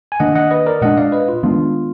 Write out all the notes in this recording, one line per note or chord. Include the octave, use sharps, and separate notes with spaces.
G#5
D#3 A#3 D4 D#5 F#5
D#5 F#5
B4 D#5
A#4 D5
A#2 G#3 D4 D#5 F#5
D5 F5
B4 D#5
F4
D#3 G#3 B3 D4 F4